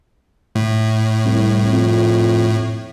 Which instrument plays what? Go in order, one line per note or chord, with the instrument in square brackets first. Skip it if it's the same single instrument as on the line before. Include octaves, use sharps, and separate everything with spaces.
[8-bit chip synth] A2
[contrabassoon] C2
F2